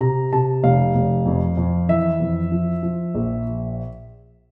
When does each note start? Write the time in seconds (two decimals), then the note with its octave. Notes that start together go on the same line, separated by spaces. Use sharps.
0.01 C3 A#5
0.33 C3 A5
0.63 F1 F5
0.95 F1
1.26 F2
1.57 F2
1.89 E3 E5
2.20 F2
2.52 F3
2.83 F3
3.15 A#1